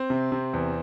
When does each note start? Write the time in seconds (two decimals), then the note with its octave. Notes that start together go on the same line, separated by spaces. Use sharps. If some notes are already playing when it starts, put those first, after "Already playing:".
Already playing: C4
0.10 C3
0.32 C3
0.53 E2